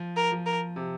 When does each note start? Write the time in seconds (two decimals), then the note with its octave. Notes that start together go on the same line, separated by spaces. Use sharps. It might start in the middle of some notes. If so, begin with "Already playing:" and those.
Already playing: F3
0.17 A#4
0.32 F3
0.46 A#4
0.76 C3